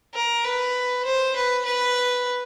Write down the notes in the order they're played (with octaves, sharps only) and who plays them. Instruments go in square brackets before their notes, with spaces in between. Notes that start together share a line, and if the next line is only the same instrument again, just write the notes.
[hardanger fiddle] A#4
B4
C5
B4
B4